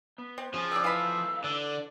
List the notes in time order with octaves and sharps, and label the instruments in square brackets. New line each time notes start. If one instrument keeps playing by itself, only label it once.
[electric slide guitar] B3
[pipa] C4
[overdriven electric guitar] F3 [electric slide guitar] C#4 G#4
[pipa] C4 D5 [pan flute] E6
[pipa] E3 B5 [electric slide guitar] A3 F5
[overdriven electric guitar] D3 [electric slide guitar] D5